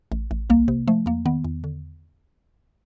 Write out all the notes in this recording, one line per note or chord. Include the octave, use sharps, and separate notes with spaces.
A1
A1
C2 A#3
C3
F3 A3
E2 A#3
D#3 B3
E2
D3